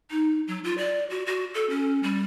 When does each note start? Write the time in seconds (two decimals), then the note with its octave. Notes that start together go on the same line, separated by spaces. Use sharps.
0.11 D#4
0.48 F#3
0.64 F4
0.78 D5
1.10 F#4
1.26 F#4
1.54 A4
1.70 C#4
2.03 G3